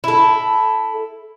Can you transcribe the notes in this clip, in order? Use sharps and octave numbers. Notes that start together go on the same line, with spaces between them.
E4 A4